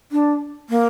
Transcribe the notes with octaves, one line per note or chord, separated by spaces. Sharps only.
D4
A#3